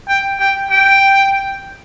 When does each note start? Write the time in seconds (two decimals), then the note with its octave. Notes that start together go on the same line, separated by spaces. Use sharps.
0.09 G5
0.40 G5
0.71 G5